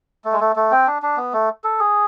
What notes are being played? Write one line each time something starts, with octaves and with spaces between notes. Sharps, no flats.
A3
G#3
A3
A3
C4
D4
D4
B3
A3
A4
G#4